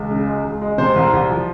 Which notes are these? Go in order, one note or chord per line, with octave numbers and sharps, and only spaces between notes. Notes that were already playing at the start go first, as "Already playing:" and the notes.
Already playing: C#2
C#3
G#3
C#2
G#3
C3 C5
C2
C2
F3